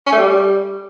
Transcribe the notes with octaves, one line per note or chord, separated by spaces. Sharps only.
C#4
A3
G3